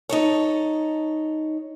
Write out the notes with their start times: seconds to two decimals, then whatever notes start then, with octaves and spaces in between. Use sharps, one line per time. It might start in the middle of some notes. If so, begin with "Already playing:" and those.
0.09 D#4 A4 C#5